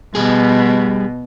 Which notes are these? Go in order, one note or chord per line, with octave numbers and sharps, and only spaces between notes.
B2 G3 G#4